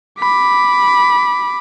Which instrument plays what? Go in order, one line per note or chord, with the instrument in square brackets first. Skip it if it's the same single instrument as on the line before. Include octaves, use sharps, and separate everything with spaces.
[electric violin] B5 D6